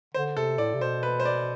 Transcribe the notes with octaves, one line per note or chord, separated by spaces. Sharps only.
D3 C5
C3 A4
A2 D5
C3
B2 C5
B4
C5
D5